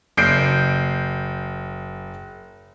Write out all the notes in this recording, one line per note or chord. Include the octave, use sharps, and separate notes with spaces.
F#1 G6 C7 D7